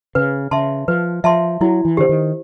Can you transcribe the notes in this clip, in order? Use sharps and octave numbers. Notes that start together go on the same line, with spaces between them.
C#3 B4
C#3 E5 A5 C6
F3 B4
F3 E5 A5 C6
F#3 E4
E3
D3 G4 C5
D#3